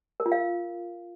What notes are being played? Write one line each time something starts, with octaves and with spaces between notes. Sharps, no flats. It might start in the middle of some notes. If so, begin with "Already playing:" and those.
A#4
F4
F5